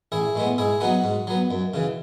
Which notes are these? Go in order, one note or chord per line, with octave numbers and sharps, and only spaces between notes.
A1 E4 G#4
A2 G#3 B3
G#2 E4 G#4
F#3 B3 D#4 F#4
G#2
F#3 B3
F#2
C#3 E3